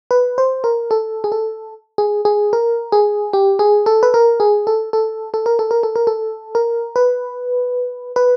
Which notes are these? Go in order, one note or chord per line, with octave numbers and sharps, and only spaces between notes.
B4
C5
A#4
A4
G#4
A4
G#4
G#4
A#4
G#4
G4
G#4
A4
B4
A#4
G#4
A4
A4
A4
A#4
A4
A#4
A4
A#4
A4
A#4
B4
B4